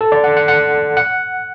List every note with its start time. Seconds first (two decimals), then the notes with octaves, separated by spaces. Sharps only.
0.01 A4
0.12 D5
0.24 F#5
0.37 F#5
0.48 F#5
0.97 F#5